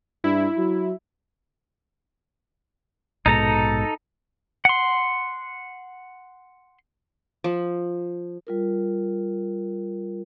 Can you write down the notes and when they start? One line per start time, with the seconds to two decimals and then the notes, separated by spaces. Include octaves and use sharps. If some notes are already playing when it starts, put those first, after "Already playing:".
0.24 G2 E4
0.58 F#3
3.26 A#1 G#2 B2 D#4 A4 A#5
4.65 F#5 C6
7.44 F3
8.47 G3 F4 A#4